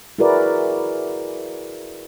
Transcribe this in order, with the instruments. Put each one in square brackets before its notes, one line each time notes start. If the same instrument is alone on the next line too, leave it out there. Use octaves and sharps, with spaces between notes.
[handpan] E4 F#4 G#4 A#4 B4 D5